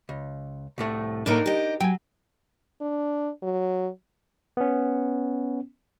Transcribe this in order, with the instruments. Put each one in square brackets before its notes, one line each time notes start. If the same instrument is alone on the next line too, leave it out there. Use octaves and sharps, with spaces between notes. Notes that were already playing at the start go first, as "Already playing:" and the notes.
[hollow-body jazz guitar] C#2
C2 A2 A3
[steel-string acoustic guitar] A2 A3 A#3 [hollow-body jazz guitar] D4 D#4 A#4
[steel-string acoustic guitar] G4 D#5
[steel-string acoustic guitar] F#3 [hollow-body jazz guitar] G5 G#5
[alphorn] D4
F#3
[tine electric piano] B3 C#4